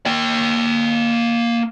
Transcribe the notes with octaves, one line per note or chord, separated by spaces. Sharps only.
A#3 G5